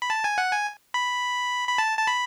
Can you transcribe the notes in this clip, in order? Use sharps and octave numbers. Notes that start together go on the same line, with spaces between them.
B5
A5
G#5
F#5
G#5
B5
B5
A5
A5
B5